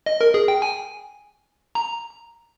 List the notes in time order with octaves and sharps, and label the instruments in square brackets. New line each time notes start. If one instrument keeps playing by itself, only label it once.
[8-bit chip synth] D#5
A#4
G#4
G5
G#5
A#5